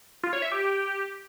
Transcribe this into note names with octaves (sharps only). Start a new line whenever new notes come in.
F4
C#5
E5
G4